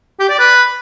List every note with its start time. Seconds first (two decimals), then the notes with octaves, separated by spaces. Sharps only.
0.20 G4
0.29 D5
0.39 B4